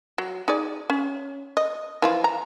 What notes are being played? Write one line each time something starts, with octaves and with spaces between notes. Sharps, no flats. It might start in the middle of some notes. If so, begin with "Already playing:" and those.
F#3
D#4 G#4 D5
C#4
D#5
E3 F3 F4
A#5